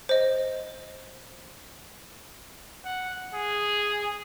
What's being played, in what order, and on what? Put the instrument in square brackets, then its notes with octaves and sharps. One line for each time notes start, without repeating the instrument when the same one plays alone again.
[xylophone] C5 D#5
[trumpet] F#5
G#4